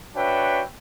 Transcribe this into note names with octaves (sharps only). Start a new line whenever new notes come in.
D4 F#4 B4 C#5 E5 G5